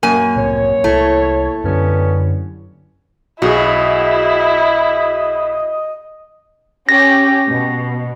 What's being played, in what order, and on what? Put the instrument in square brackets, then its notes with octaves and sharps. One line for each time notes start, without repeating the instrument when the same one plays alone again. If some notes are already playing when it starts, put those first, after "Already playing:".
[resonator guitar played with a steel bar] F#2 G#5 [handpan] A#3 A#4
[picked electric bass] C2 A2 C3 [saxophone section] C#5
[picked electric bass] C2 [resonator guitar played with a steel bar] A3 [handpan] E4
[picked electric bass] F#2 D3 [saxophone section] G3 B3 C#4
[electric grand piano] B1 G#4 [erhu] E4 [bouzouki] F#4 [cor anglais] D#5
[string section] C#4 G4 [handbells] A#6
[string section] B2